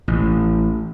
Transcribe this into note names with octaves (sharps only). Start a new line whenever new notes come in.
A1